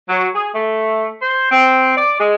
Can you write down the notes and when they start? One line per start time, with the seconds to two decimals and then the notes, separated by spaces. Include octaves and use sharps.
0.08 F#3
0.33 G#4
0.53 A3
1.21 C5
1.49 C4
1.96 D5
2.18 G#3